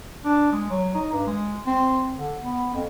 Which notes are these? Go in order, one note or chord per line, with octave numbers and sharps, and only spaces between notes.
D4
G#3
F#3
D#4
G2
G#3
C4
D3
B3
F2